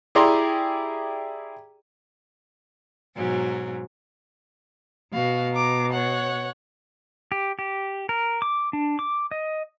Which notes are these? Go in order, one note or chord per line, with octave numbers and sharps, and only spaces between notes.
E4 G4 G#4 D5 A#5 C6
G#2 B2 F#3
B2 F#4 F5
A#5 D6
C#5 F#5
G4
G4
A#4
D6
D4
D6
D#5